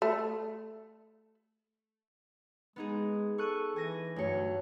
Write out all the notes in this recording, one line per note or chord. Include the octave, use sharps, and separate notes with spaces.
A3
G#3 B3 D#4 G#4
A4 C#6 F#6 D#7
E3 G#5 A#6 D#7
D2 G2 F#3 C#7